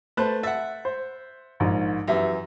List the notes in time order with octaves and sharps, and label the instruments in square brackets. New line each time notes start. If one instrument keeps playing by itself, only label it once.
[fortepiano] A3 A5 F#6 [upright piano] B4 C5
[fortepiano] E5 F#5 [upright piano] A6
[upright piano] C5
A#1 G#2
[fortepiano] F#2 E3 [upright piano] G4 E5